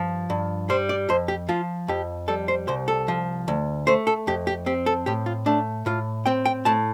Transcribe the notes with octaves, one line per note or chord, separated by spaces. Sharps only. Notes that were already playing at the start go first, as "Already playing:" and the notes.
Already playing: G2 F3
G2
G3 C5
D5
F2 C5
G4
F3 F4
F2 G4
G3 A4
C5
C2 C5
A4
F3
D2
A3 C5
A4
F2 G4
G4
C4 G4
A4
A2 G4
F4
A3 D4
A2 F4
C4 G5
G5
A2 A5